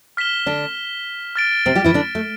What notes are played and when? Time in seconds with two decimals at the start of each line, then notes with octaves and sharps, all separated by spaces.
0.17 F6 B6 E7 G7
0.47 D3 D4
1.36 F6 A6 D7
1.66 C3 C4
1.75 G3 G4
1.84 E3 E4
1.94 D3 D4
2.15 A3